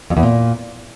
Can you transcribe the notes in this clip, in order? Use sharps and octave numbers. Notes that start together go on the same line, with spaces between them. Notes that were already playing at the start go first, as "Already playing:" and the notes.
F2
E2
A#2